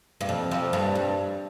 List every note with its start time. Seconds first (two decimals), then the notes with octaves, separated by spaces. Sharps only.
0.21 G2
0.29 F2
0.51 F2
0.73 G2
0.95 G2